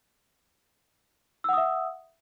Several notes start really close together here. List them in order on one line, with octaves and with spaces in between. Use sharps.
E6 F#5 D#6 E5